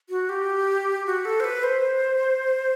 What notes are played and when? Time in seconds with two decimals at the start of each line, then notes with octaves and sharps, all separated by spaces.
0.09 F#4
0.29 G4
1.06 F#4
1.25 A4
1.40 C5
1.44 B4
1.63 C5